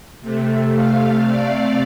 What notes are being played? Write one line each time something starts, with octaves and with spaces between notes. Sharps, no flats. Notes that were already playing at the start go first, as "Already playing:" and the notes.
C3 A3
F5
D5